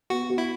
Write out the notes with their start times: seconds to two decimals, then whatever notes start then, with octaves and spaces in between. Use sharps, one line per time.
0.10 B3 F#4
0.30 F#4
0.38 E4